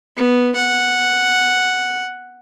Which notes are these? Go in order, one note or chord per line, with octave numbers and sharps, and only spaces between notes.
B3
F#5